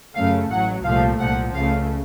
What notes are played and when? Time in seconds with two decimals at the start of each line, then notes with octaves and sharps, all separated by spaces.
0.14 F#2 C#3 A3 F5
0.50 A1 A2 F#3 F#5
0.84 C2 A#2 F3 A3 F5
1.19 C2 A#2 F3 F#5
1.53 C#2 C#3 A3 F5